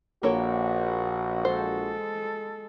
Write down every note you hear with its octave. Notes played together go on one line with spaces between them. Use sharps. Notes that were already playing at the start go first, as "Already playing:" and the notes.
A#1 A#3 F#4 A4 C#5
G#3 A4 C5